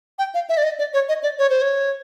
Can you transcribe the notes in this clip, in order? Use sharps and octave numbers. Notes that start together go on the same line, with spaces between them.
G5
F5
E5
D5
D#5
D5
C#5
D#5
D5
C#5
C5
C#5